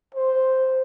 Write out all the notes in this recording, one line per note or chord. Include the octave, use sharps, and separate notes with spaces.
C5